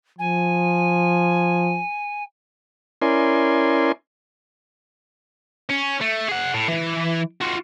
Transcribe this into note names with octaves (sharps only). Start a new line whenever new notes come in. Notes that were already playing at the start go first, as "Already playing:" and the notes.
F3 G#5
C#4 E4 A#4 D5 G#5 C6
C#4
A3
G#4 F#5
A2
E3
F4 F#4